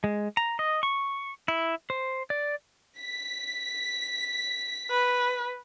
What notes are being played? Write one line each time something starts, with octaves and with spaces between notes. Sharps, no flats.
G#3
A#5
D#5
C#6
E4
C5
D5
B6
B4